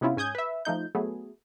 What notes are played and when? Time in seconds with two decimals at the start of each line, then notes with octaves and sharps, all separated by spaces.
0.01 C3 B3 C#4 E4 F4
0.17 G#2 C#4 G#5 D#6 G6 G#6
0.35 B4 E5
0.65 F3 A3 D#4 G6
0.95 F#3 A3 B3 G#4